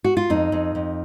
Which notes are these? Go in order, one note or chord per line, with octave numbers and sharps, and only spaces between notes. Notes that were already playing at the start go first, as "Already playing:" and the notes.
F#4
F4
F2 D#4
F2
F2